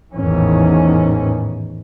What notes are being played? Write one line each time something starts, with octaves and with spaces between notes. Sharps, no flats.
A1 E2 G#2 D#3 E3 C#4